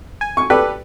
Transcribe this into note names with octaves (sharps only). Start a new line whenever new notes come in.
G#5
C#6
G4 A4 B4 D5